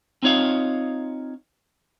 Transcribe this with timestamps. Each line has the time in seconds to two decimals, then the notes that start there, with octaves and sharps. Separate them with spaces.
0.23 C4 D#4 F4 C#5 D#5 F5